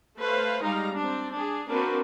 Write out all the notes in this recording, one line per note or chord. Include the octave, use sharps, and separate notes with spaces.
A3 B4 C5 F5
G3 G#3 D#4 F5 A#5
C4 D4
D4 G#4
A#3 C4 D4 F#4 A#4 B4